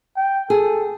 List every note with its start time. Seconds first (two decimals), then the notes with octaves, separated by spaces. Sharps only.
0.16 G5
0.50 G#4 A4